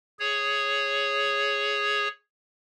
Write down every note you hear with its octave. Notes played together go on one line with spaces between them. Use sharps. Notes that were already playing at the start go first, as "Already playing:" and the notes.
G#4 C#5